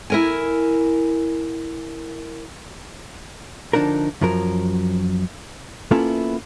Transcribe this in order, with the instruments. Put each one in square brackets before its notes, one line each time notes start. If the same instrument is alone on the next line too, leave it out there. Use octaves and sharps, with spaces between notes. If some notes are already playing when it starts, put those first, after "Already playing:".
[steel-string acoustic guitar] E4 A#4 G#5
[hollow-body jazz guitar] D3 F3 D4 D#4 A#4
F#2 F3 F#3 A#4
A#3 B3 C#4 E4 F4 A4